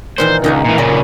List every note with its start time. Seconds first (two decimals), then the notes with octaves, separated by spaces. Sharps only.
0.18 A#2 D#3 E3 C5
0.44 C#2 D#3 D#4 F#4
0.65 A#2 E3
0.78 A#2 C#3 D5